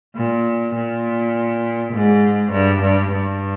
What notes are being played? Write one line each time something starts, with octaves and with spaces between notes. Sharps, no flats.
A#2
A#2
G#2
G2
G2
G2